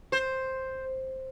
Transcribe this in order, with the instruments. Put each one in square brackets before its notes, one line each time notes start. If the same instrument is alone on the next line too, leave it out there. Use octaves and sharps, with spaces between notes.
[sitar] C5